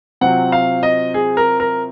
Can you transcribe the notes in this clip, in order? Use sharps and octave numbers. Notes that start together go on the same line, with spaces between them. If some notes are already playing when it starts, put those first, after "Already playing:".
C3 F#3 C4 F4 F#5
F5
D#5
G#4
A#4
A#4